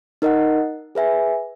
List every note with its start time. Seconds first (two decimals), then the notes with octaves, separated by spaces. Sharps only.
0.22 D#4 A#4 D#5 F#5
0.95 G#4 B4 E5 G#5